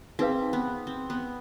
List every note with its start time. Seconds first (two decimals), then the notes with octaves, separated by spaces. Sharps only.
0.19 C4 D#4 G#4 B4 F5
0.53 B3
0.87 C4
1.10 B3